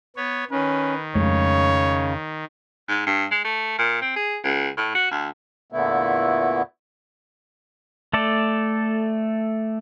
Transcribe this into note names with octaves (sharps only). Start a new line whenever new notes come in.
B3 C#5
D#3 C#4 B4
F2 C#3 G#3 A3 C#5
G#2
G2
G#3
A3
A#2
C4
G#4
C#2
A2
F#4
D2
E2 A#2 D3 A3 B3 E4
A3 A4 D5